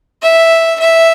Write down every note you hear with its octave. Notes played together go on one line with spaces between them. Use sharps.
E5
E5